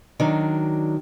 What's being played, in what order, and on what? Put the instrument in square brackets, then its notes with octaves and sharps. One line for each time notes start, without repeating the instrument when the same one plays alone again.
[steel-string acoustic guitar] D#3 F#3 D4